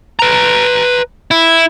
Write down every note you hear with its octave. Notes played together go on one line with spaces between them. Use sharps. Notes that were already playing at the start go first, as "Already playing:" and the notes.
B4 A#5
E4